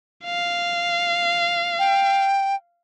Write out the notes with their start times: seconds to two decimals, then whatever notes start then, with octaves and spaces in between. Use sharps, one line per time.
0.25 F5
1.79 G5